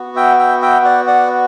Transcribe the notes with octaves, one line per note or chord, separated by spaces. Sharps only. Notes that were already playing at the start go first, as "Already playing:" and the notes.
Already playing: B3 F#4
E5 G5
E5 G5
E5 G5
D5 F#5
D5 F#5